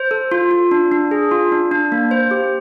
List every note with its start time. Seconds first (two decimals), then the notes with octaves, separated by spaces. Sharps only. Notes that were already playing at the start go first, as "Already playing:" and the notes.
Already playing: C5
0.11 A4
0.32 F4
0.51 F4
0.71 D4
0.92 D4
1.11 G#4
1.31 F4
1.52 D4
1.71 D4
1.92 A#3
2.11 C5
2.31 G4